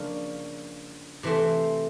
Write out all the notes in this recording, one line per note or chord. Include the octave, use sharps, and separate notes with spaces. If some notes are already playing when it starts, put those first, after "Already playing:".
Already playing: C#3 F3 A#3 D4 F4
C3 E3 A3 C4